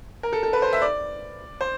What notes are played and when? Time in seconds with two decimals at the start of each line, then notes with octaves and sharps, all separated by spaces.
0.23 A#4
0.33 A4
0.43 A4
0.53 B4
0.62 C5
0.73 E5
0.82 D5
1.61 C5